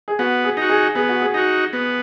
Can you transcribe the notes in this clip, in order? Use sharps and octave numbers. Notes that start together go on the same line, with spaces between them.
G#4
B3 F#4
G#4
D#4 F#4
G#4
B3 G#4
F#4
G#4
D#4 F#4
B3